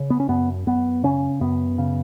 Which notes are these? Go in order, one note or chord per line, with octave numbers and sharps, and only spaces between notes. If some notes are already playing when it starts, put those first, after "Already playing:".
Already playing: C#3
B3
C#4
F#2 B3
F#2 B3
C#3 C#4
F#2 B3
C#3